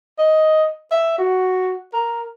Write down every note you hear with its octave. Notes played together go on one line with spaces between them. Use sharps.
D#5
E5
F#4
A#4